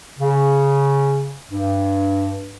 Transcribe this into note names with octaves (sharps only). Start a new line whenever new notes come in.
C#3
G2